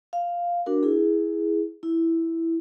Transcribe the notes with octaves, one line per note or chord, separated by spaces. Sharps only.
F5
D4 F#4 A#4
E4 G#4
E4